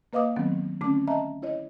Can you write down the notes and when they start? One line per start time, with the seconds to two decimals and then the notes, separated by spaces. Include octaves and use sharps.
0.13 A#3 B4 D#5 F5 D6 D#6
0.36 D#3 F#3 B3 C4
0.81 D3 A3 C4 C#4 D6
1.08 D#5 E5 A5 A#5
1.42 E4 C#5 D#5